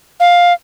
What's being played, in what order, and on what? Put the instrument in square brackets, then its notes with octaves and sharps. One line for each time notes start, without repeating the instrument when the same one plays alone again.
[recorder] F5